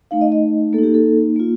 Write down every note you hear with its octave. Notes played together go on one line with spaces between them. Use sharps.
A3 D#4 F5
D#5
D#5
A#3 A4
D#4 G4
A4
A#3 F4